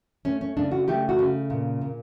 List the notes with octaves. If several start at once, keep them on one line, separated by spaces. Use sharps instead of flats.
A3 C#4
C#4
C#3 D4
F#4
A3 G4
F#4
C#3
A#2
A#2